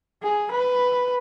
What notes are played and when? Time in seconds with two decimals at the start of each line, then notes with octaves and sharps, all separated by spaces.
0.23 G#4
0.51 B4